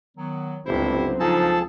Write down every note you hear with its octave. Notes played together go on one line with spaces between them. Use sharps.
D#3 F#3 B3
G1 C#2 F#3 C4 E4 G4 C5
C#3 F3 D4 D#4 G#4 A4 A5